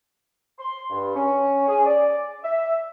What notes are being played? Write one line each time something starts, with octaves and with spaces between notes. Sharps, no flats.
C6
G2
C#4
G#4
D5
E5